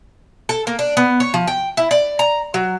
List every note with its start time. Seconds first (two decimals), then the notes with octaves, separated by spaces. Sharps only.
0.49 A4
0.67 A#3
0.79 D4
0.97 B3
1.20 C#5
1.34 F3
1.47 G5
1.77 E4
1.91 D5
2.19 A#5
2.54 F#3